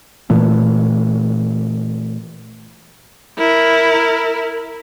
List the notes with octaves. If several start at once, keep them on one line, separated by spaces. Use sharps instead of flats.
A#2 E3 A3
E4 A#4